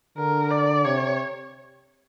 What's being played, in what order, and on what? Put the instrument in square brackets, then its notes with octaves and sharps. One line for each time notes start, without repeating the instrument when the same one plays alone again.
[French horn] D3 [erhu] A#4
[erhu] D5
[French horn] C3 [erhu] C#5